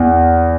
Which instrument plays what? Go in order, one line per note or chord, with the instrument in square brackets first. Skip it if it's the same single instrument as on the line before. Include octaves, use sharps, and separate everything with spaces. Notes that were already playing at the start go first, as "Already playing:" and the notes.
Already playing: [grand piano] E2